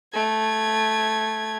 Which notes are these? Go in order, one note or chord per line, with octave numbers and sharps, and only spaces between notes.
A3 G#6